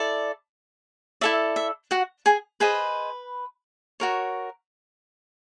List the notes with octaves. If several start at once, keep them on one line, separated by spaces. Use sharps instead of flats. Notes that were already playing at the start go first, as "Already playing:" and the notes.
Already playing: E4 A4 D5
E4 A4 D5 E5
E5
F#4 F#5
G#4 G#5
G#4 B4 C5 D#5 B5
F#4 A#4 C#5